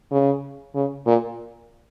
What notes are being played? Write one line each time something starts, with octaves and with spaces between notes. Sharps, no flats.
C#3
C#3
A#2